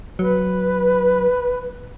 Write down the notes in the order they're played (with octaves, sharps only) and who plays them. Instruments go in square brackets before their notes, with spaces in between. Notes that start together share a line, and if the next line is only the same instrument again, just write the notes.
[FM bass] F#3 [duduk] B4